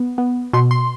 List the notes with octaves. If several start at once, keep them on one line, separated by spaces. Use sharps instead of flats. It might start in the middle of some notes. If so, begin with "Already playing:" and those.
Already playing: B3
B3
B2 C6
C6